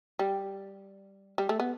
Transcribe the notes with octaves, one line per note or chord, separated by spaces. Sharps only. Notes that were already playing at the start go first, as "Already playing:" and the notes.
G3
G3
A3
B3